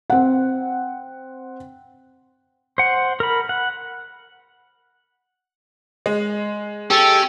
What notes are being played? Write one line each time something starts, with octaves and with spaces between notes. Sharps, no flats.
C4 F#5
C5 F#5
A#4 B5
F#5
G#3
C#4 G4 A4